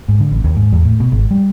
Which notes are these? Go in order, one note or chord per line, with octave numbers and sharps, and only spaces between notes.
G#2
D3
A1
D#2
G#2
E2
A2
B2
G#1
G3